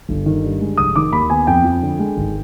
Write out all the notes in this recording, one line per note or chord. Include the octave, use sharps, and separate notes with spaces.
G1
D#3
G2
G#3
F1 D#6
D#3 D6
D#2 B5
B3 G#5
F2 G5
F3
D3
G#3
G#1